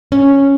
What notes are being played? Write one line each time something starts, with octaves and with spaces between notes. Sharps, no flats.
C#4